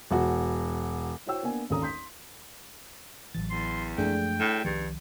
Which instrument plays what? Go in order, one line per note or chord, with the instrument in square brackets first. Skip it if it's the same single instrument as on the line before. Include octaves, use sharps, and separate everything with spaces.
[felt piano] E1 F#4
E4 F#4 C5 C#5 G5 E6
A#3 B3 D4 G#5
G#1 D#2 C#4 A4 A#5 D#6
C6 G6 B6
[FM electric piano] A1 A6 [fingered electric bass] E3 F#3
[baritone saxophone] E2 [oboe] C6
[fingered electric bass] F#2 F3 G#3 [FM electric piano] A3 D4 G#4 [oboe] G5
[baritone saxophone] A2
[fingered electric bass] C2 D#3 F3 [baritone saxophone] G2